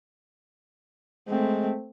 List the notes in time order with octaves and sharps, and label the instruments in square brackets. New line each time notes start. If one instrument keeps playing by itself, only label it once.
[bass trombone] G#3 [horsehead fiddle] A3 C4